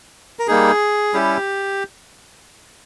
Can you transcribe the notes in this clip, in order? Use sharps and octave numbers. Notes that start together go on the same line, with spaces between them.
A#4
G3 A#3 D#4 G#4
G3 C#4 E4 G4